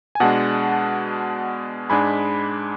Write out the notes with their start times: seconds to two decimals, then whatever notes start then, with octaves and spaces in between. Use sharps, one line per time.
0.15 G#5
0.20 B2 G#3 D4 F#5 A5
1.90 G#2 G#3 D4 G#5 B5